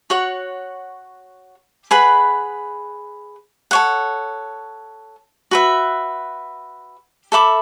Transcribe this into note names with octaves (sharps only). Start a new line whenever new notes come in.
F#4 C#5 F#5
G#4 B4 F#5 B5
A4 C#5 F#5
F#4 B4 E5
A4 E5 B5 D6